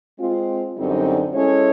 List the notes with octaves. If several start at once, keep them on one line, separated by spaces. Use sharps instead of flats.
G#3 C4 F4
F#2 D3 G3 C4 D#4
G#3 C#4 E4 A4 C#5